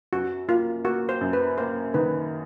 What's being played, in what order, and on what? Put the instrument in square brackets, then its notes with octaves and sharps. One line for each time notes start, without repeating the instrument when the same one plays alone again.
[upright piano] F#2 [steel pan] F#4
[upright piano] A#3 [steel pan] F4
[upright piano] A#3 [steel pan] F#4
[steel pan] C5
[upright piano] F#2
[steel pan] B4
[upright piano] A#3 [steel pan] C5
[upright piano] D#3 [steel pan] B4